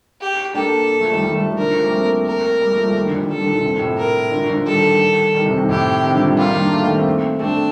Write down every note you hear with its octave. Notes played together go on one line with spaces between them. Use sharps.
G4
A#3 D4 A4
F3 A3
D#3 G3
D#3 G3
F3 A3
D#3 G3
D3 F3 A#4
F3 A3
G3 A#3
A3 C4
A#4
G3 A#3
F3 A3
F3 A3
D#3 G3
D3 F3
D#3 G3
D#3 G3 A4
A#2 D3
D3
C3
A#2
A2 C3
A#4
A#2 D3
D3 F3
D#3 G3 A4
D#3 G3
C3 D#3
C3 D#3
A2 C3 G4
C3 D#3
D3 F3
D#3 G3
G3 A#3 F4
D#3 G3
A#3 D4
F3 A3
D#3 G3
A3 C4
A3 C4 D4